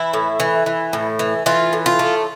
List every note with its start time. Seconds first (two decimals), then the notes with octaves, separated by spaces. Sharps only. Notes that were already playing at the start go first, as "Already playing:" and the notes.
Already playing: E3 E4
0.14 A2
0.40 E3
0.66 E3
0.93 A2
1.19 E3
1.46 E3 F4
1.73 A2
1.86 F4
1.99 A3